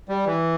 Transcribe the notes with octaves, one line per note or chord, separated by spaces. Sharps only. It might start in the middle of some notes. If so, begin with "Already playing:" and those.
G3
E3